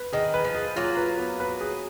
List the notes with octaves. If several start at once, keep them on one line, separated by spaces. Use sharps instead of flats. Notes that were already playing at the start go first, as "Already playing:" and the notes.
Already playing: B4
D#3 G#4
B4
F3
G#4
F#3 A#3 F4
B4
B3
B4
G#4